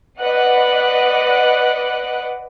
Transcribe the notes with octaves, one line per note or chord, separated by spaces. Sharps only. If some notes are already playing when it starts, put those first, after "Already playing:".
B4 D5 D#5 F#5 F#6